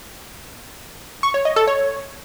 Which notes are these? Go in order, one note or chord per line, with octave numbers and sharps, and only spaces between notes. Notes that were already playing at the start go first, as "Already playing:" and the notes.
C#6
C#5
D#5
A4
C#5